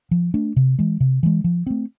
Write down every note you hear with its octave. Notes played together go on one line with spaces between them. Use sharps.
F3
A3 D4
C3
E3 G#3
C3
E3 G#3
F3
A3 C4